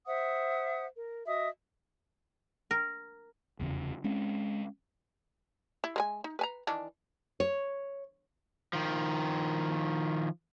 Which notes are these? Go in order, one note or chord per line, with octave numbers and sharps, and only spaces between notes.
C5 E5 F#5 D#6
A#4
F#4 D#5 E5 D#6
A#4
F1 E2 C#3
G#3 C4 C#4
E4
G#3 A#4 G#5
D#4
B4 G#5 A#5
D#3 E3 D4
C#5
D#3 F3